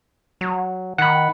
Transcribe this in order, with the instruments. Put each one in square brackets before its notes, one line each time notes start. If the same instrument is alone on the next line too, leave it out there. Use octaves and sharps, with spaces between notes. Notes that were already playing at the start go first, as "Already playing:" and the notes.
[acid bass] F#3
[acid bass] D#3 [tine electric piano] F#5 B5